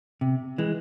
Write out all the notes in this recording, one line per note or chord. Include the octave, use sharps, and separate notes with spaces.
C3
E3 G#3